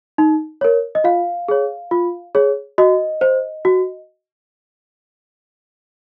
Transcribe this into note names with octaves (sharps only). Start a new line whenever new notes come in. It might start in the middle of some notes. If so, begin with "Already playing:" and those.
D#4
A#4 C#5
D#5
F4 F5
G#4 C#5
F4
G#4 C#5
F#4 D#5
C5
F#4